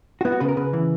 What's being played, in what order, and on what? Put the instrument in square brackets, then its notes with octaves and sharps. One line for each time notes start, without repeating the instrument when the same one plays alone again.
[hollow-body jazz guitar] F#4
B3 E4
F#4
C#3 B4
A#4
C#3 B4
E3